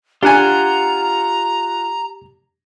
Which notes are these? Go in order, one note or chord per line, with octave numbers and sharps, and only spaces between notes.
D4 F4 G4 F#5 G#5 A#5